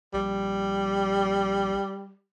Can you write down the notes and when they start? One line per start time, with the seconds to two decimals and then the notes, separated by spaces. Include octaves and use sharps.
0.14 A#1 G3